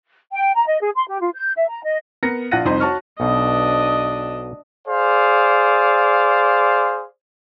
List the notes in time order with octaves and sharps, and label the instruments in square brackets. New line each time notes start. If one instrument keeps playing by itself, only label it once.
[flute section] G5
A#5
D#5
G#4
C6
G4
F4
G6
E5
A#5
D#5
[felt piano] B3 A#4 A#6 C#7
A#1 F4 F#5 F#6 A#6 D#7
C2 F2 D#4 C5 C6
F#4 C#5 A5 C#6 F6
[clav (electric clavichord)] B1 B2 [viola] D4 D#5
[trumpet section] G#4 C5 D5 F5